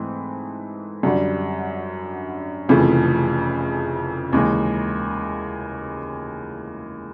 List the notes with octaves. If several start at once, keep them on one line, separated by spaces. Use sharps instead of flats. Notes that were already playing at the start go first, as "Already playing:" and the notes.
Already playing: G#2 E3 A3 C4
F#2 D3 G3
F1 F2 C#3 E3 A3
D#2 C#3 E3 G#3